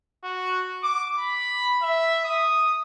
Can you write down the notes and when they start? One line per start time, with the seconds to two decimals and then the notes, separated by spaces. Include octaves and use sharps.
0.24 F#4
0.83 D6
1.19 B5
1.82 E5
2.25 D#6